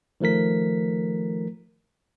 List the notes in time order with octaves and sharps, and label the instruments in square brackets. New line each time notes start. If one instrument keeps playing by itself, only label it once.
[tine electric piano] D#3 F3 A3 A#4 B6